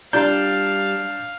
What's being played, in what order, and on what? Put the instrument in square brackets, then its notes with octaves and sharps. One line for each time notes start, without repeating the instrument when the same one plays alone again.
[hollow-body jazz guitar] G3 F4 A#5 [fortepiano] D4 [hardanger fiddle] F5 [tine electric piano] G6